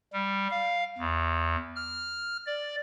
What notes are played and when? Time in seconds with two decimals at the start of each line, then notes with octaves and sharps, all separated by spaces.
0.13 G3
0.51 F5
0.98 E2
1.76 F6
2.47 D5